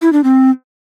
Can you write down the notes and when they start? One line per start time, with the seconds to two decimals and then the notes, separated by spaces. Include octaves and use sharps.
0.02 E4
0.13 D4
0.24 C4